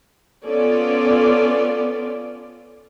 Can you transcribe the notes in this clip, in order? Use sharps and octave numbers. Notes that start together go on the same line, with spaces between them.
B3 C#4 F4 A4 D5